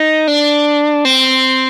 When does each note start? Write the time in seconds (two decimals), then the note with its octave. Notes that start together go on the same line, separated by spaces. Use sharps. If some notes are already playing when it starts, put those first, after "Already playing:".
Already playing: D#4
0.27 D4
1.05 C4